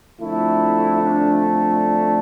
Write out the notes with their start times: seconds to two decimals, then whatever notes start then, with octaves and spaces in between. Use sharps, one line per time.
0.20 F2 D3 A3 E4
1.02 D4
1.43 D4